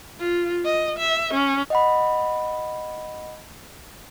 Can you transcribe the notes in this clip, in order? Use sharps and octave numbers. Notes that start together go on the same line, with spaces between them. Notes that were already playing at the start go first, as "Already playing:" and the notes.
F4
D#5
E5
C#4
D#5 F#5 B5